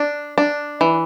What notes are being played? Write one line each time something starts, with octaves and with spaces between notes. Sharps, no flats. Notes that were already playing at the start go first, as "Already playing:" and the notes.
Already playing: D4
D4
E3